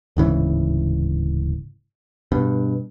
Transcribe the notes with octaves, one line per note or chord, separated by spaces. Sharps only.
D1 G#2 C#3 E3
G2 B2